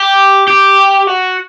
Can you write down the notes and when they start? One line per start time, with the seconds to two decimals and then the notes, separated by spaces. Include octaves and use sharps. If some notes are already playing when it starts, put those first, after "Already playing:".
Already playing: G4
0.48 G4
1.07 F#4